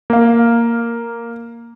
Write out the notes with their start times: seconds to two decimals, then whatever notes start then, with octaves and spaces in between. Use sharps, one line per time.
0.10 A#3 F5